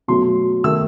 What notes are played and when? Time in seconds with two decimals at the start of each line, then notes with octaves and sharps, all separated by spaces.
0.08 B2 F#3 A3 C6
0.64 D#3 A3 E6